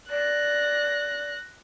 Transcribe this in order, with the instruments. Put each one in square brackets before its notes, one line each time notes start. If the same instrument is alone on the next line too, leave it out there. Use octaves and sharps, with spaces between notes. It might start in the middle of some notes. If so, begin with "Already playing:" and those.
[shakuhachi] D5 [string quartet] F#6 A#6